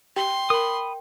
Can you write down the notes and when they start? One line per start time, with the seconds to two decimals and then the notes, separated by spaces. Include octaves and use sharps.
0.16 G4 G5 C6
0.50 A#4 B5 D#6